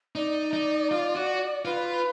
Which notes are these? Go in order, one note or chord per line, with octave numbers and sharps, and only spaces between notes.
D#4 D5
D#4
F4
F#4
F4 B4